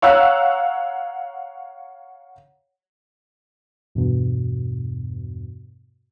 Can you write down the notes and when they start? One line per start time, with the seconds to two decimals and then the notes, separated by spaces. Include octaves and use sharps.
0.02 C#5 F5 F#5 A#5 E6 F#6
3.95 E2 G2 B2